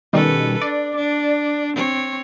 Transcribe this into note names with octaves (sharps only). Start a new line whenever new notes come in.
B2 D#3 G3 C#4 A4 B4
D4 D5
D4
C4 C#5